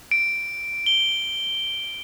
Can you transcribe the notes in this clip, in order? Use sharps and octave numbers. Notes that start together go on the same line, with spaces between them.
D7
G7